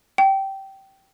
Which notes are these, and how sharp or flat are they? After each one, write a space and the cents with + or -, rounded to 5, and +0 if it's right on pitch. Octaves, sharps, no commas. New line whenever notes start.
G5 -15